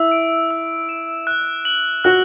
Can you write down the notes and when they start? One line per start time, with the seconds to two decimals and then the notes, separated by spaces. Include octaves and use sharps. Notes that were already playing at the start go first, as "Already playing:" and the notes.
Already playing: E4 E6
0.12 D7
0.51 E6
0.89 E7
1.27 F#6
1.65 F#7
2.04 F#4 F#6